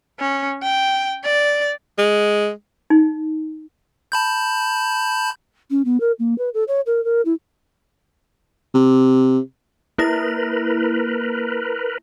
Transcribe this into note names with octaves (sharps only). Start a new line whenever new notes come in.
C#4
G5
D5
G#3
D#4
A5 B5 G6
C#4
B3
A#4
A#3
B4
A4
C#5
A#4
A#4
E4
C3
A#3 E4 A#4 B4 A#6